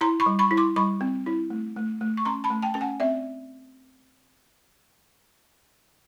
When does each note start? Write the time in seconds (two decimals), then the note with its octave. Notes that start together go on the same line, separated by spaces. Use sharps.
0.01 E4 A#5 C6
0.20 B5 C#6
0.26 G3
0.39 B5 C#6
0.51 E4
0.57 C6 D6
0.76 G3 B5 C#6
1.01 C4
1.26 E4
1.50 A3
1.76 A3
2.01 A3
2.17 C#6
2.25 C#4 A#5 C6
2.44 A5 B5
2.50 A3
2.62 G5 A5
2.74 C#4 A5
2.81 F#5 G#5
3.00 C4 D5 E5